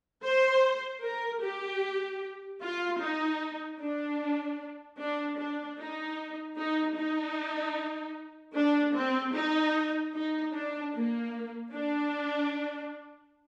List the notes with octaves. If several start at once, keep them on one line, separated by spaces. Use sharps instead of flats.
C5
A#4
G4
F4
D#4
D4
D4
D4
D#4
D#4
D#4
D4
C4
D#4
D#4
D4
A#3
D4